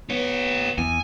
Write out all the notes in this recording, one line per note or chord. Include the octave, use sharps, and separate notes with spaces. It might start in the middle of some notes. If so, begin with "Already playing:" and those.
B3 G4 C#5
E2 G#5